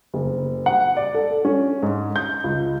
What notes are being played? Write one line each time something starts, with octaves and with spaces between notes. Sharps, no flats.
F#1
F#5
D5
A4
C#4
G#2
G6
C#2